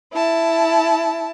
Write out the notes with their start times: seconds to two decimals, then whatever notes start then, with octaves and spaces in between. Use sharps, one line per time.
0.13 E4 A5